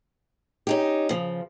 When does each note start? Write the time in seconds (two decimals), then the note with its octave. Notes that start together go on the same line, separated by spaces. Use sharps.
0.67 C#4 D#4 G4
1.09 C#3 F3